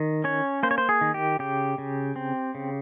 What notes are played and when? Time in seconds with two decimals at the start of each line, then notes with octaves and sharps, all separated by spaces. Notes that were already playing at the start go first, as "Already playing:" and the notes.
Already playing: D#3
0.24 C#4 C#5
0.63 A#3 C5
0.71 C#5
0.78 C5
0.89 G#4
1.01 D#3
1.14 G4
1.39 C#3 G4
1.78 C#3
2.16 C4
2.55 C#3